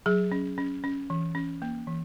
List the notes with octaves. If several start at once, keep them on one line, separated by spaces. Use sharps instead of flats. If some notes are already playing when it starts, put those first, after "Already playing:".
F#3 G#4
C#4
C#4
C#4
E3
C#4
A#3
E3